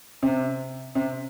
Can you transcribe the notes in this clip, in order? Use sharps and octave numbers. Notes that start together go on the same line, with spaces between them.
C3
C3